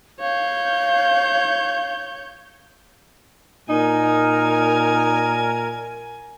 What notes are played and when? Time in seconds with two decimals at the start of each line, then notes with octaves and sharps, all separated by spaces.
0.20 C#5 F5 G6
3.69 A#2 D#4 A#4 G#5